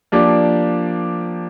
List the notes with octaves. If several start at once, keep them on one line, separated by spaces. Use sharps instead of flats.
F3 A#3 D4 G4 D5